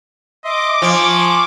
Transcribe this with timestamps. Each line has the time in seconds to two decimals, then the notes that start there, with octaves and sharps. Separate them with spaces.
0.44 D#5 E5 C6 D6
0.82 F3 G#5 C6 C#6